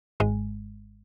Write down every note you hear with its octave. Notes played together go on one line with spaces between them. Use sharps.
G#1 G#2 G#3